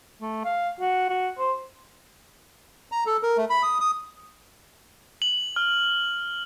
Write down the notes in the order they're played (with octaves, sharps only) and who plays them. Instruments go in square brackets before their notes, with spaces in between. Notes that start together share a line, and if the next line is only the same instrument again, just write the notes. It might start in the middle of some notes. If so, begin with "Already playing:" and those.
[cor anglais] A3
F5
F#4
F#4
C5
[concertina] A#5
A4
A#4
A3
B5
D#6
D#6
[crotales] F#7
F6